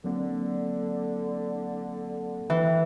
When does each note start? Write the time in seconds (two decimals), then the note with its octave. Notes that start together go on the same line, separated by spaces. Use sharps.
0.04 D3 F#3 A#3 C4
2.50 E3 B4 G5